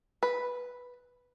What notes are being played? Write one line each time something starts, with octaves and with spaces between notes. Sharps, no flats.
B4